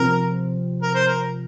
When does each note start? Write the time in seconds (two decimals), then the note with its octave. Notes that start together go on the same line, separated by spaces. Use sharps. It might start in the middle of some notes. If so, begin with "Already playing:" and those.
Already playing: C3 F3 C4 A#4
0.82 A#4
0.94 C5
1.07 A#4